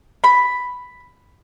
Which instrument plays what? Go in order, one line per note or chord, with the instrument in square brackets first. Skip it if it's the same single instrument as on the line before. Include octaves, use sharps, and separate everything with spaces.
[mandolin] B5